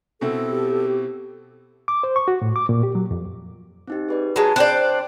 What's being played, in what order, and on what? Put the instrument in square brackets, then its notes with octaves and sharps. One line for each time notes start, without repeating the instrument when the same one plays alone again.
[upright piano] B2 C4 E4 [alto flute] A4
[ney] G4
[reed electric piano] D6
C5
C#6
F#4
A2
D6
A#2
G4
F#3
F2
[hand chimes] C4 D#4 G4
G#4 B4 D5
[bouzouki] F#3 G#3 [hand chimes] A5 B5
[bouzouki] D4 C5 D5 [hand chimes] G5 F#6